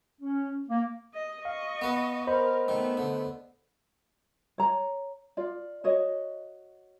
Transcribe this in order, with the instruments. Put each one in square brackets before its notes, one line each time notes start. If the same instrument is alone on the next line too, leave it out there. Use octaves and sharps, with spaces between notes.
[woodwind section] C#4
A#3
[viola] D#5
[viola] D#5 C#6 [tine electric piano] F5
[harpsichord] B3 B4
[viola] A#4 [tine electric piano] C5 D#5 B5
[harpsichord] D#3 [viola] A3 B3
[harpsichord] D3
[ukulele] C#5 A#5
F4 D5
F#4 C#5 D#5